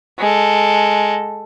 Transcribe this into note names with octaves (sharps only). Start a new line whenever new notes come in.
G#3 A4